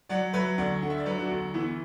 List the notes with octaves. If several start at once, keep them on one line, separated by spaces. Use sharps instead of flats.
F#3 D5 F#5
F#3 B4 E5
D2 D5 F#5
D3 F#5
E5
D5
F#3 B4 E5
D4 F#4
D2
E3 B3 E4